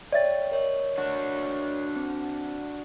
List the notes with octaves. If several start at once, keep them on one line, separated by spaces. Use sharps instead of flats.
C#5 D5 E5 G5 A6
A#4 C#5 D#5
D4 F#4
C4